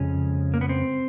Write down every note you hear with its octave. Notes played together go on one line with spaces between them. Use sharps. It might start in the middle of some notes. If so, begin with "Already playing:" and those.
Already playing: F2 C#3 F3 G#3 C#4
A#3
B3
C4